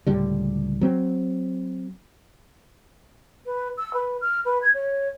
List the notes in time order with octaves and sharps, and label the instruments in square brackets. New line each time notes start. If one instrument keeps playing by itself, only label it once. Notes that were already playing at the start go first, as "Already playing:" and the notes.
[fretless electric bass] C#2 A2 D3 G3
F#3 C4
[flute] B4
E6
B4
F6
B4
G#6
C#5